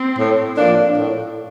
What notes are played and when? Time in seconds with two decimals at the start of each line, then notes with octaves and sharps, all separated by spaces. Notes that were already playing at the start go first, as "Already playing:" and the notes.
Already playing: C4
0.18 A2
0.57 F3 A#3 D4
0.97 A2